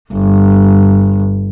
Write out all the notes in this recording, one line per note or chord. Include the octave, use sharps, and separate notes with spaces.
G1